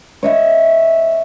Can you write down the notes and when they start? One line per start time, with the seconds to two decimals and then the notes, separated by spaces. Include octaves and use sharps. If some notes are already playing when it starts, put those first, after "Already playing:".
0.23 C#5 D#5 E5